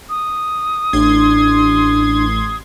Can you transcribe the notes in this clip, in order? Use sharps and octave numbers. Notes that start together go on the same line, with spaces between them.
D#6
A1 D4 C6 G#6